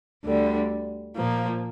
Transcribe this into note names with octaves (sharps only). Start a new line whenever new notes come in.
D2 D3 G3
A#2 F3 A#3